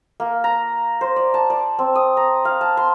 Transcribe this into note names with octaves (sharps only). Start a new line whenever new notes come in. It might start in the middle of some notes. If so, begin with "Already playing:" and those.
A#3
A#5
C5
D5
A5
D5
C4
D#6
A#5
F5
A5
C6